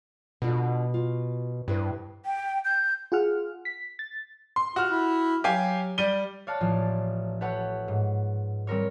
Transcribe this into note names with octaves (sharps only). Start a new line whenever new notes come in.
B2 D3 F4
F4
G2 E4 B4 C5
G5
G6
F4 G#4 F#5 F6
B6
A6
C6
F4 F#4 F6
E4
F#3 G4 F5 G#5
G3 D#7 G7
C#5 D5 F5 A5 F#6
A1 F3
G4 A4 B4 C#5 F#5
G#2
G3 C4 A#4 C#5